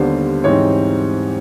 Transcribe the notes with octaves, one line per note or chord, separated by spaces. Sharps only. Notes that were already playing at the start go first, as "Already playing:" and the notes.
Already playing: D#2 D3 G3 B3 D4 C5
G#2 E3 G3 C4 D#4 C#5